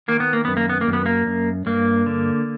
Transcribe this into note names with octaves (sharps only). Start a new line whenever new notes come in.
D#3 A#3
B3
A#3
F#2 B3
A#3
B3
A#3
F#2
B3
A#3
F#2
G2 A#3
D3